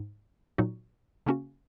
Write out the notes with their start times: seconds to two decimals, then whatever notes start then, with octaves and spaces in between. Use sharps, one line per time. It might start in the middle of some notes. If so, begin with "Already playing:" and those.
Already playing: G#2
0.58 A#2 F#3 D#4 F#4
1.26 C#3 A#3 C#4 F#4